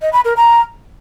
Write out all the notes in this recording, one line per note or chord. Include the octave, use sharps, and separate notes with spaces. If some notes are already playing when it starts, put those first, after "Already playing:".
D#5
B5
A#4
A#5